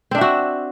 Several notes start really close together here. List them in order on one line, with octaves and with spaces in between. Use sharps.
C4 D4 E5 F#4